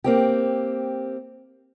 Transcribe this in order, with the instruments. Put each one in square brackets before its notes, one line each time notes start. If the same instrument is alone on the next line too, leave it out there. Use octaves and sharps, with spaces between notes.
[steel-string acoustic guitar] A#3 C4 G4